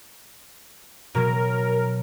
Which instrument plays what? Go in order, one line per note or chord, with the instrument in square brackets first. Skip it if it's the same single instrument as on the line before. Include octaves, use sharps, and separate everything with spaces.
[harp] B2 F#3 [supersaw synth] A#4